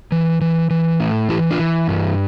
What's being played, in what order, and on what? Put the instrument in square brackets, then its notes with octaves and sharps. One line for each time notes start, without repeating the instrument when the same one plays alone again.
[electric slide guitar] E3
E3
E3
A2
E3 E4 G4
D4 F4
E3
G2